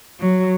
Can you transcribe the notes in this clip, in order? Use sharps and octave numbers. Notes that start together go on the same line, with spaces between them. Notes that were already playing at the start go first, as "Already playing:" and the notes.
F#3